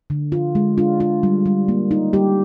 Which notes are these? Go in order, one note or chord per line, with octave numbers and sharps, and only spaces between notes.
D3
F4
G#3
D4 F4
F4
G3
G3
A#3
D#4
G3 G4